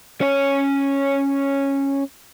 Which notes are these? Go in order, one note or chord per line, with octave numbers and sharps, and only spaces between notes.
C#4 C#5